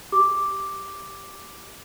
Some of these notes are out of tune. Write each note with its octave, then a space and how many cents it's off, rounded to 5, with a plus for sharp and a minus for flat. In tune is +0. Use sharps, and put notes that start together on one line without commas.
G4 +0 D6 +0